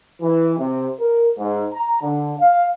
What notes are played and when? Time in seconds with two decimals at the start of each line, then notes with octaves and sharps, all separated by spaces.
0.22 E3
0.58 C3
1.00 A#4
1.38 G#2
1.74 A#5
2.02 D3
2.40 F5